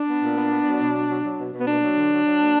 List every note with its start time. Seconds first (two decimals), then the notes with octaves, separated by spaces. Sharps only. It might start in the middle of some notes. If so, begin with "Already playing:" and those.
Already playing: D4
0.09 B3
0.23 A#2
0.37 B3
0.51 B3
0.66 F#3
0.80 B2
0.94 B2
1.09 F#3
1.24 F#3
1.38 B2
1.52 B2
1.60 B3
1.67 A#3 D4
1.81 F#3
1.95 D3
2.10 F#3
2.24 F#3
2.39 A#3